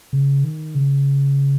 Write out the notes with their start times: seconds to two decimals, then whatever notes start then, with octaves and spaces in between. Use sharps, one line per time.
0.13 C#3
0.44 D#3
0.75 C#3